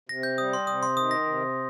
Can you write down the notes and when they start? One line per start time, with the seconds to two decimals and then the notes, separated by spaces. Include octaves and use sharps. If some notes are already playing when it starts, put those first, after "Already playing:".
0.09 C3 A#6
0.23 G6
0.38 G3 D#6
0.53 C6
0.67 C3 D#6
0.83 C6
0.97 D#3 D#6
1.11 A#6
1.26 C3